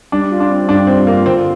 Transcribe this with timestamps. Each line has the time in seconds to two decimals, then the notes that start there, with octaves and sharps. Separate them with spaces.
0.12 G3 D4
0.31 F4
0.40 D4
0.50 C4
0.69 G2 D4
0.87 G3 C4
1.07 A#3 F4
1.26 D3 C4